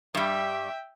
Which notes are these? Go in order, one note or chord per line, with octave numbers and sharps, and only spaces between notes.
G2 G3 E5 G5